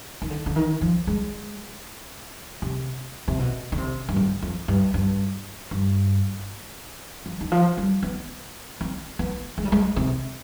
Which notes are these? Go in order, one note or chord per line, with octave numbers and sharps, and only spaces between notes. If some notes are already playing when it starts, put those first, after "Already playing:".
D#3
D3
D3
D#3
F3
G#3
C3
C3
B2
D3
C3
G2
G#2
F2
G2
G2
G2
F3
D#3
F3
G3
B3
C4
B3
G#3
G3
G#3
C3